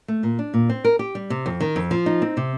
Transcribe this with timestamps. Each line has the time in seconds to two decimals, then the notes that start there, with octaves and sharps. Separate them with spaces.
0.08 A3
0.23 A#2
0.39 D4
0.54 A#2
0.70 C4
0.84 A#4
0.99 G4
1.15 G3
1.30 C3
1.46 F2
1.60 D#3
1.76 F2
1.91 F3
2.06 D#4
2.22 C4
2.37 C3